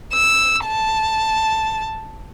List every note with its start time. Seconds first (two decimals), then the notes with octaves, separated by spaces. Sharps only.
0.14 E6
0.66 A5